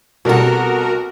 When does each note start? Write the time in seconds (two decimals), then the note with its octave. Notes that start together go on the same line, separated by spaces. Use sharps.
0.25 C2 B2 G3 F#4 A4 A#4 F#5